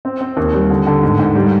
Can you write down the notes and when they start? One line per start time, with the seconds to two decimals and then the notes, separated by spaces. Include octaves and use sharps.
0.05 C4
0.21 C4
0.37 D#2
0.53 G3
0.70 D3
0.87 D3
1.03 G#2
1.19 G#2
1.35 G3